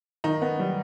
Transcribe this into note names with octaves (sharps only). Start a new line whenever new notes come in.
D#3 D#4
B3
G3